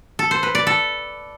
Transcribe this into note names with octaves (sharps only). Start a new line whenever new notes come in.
A4
C5
B4
D5
A4